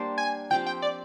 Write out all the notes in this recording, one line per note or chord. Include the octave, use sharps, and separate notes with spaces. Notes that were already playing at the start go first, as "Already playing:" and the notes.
Already playing: G3 A#3 D4 G4 C5
G#5
F3 C4 G4 G5
G5
D5